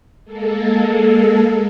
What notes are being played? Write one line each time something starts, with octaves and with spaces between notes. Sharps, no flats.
G#3 A#3 A4